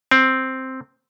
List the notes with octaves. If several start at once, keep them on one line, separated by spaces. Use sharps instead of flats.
C4